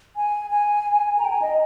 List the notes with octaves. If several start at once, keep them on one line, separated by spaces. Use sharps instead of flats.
G#5
G#5
A#5
G5
G#5
D#5